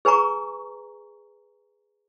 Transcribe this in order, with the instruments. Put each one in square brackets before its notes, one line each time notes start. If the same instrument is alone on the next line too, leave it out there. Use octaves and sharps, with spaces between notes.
[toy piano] G#4 B4 G#5 A#5 C#6